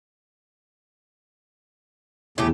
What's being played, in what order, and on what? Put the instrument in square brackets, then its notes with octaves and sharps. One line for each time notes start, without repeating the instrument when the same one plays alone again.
[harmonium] E2 [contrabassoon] A2 [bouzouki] C#3 A3 G4